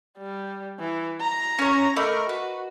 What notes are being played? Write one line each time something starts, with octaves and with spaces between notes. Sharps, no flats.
G3
E3
A#5
C#4 C#5
A3 A#4 D#5 B5 D6
F#4 B4